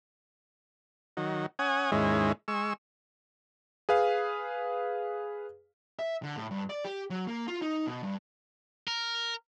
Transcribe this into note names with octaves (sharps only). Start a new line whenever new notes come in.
D#3 F#3
C#4 F#5 G#5 D#6
D#2 G#2 G#3 C#4 E4
G#3 C#6 E6
G#4 B4 F5
E5
D3
A2
G2
D5
G4
F#3
A#3
F4
D#4
B2
G2
A#4